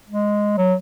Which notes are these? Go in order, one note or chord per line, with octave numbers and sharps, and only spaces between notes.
G#3
F#3